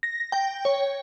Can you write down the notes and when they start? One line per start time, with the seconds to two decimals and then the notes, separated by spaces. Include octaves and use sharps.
0.03 A#6
0.32 G5
0.65 C#5